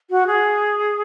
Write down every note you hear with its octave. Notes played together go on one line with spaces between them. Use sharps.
F#4
G#4